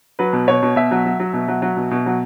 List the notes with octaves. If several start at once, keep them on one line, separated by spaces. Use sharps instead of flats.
F#3 B4
B2
B2 C#5
B2
B2 E5
F#3
F#3
F#3
B2
F#3
F#3
B2
B2
F#3